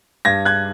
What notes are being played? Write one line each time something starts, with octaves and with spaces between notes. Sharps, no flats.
G2 G#6 A#6
F#6 G#6